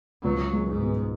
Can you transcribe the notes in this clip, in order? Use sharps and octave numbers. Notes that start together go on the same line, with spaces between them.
C#2 F#3
G#3
G#2
B2